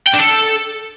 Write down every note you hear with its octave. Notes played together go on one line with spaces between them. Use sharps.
G5
D4
A4